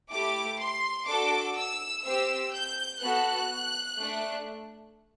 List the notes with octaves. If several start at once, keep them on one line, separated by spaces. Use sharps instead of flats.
A3 E4 G4 D6
C6
D4 F#4 A4 D6
E6
C4 G4 E6
G6
B3 F#4 A4 F#6
A3 D4